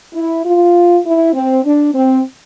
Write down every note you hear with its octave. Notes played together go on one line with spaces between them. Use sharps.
E4
F4
E4
C4
D4
C4